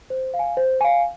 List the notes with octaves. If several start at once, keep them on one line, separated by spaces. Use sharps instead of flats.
C5
F5
G#5
C5
F5 G#5